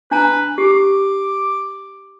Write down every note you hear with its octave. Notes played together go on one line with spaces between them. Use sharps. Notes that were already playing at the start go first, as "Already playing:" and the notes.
D4 B4 G#5 A#5
G4 D6